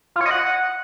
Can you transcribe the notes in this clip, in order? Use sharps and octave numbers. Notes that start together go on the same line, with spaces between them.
F4
C#5
D#5
F#5